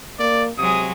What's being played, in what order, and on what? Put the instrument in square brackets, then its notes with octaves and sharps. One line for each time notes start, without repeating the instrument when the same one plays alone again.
[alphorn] A#3 [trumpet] D5
[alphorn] C3 [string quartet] F#3 G#3 [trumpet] D#6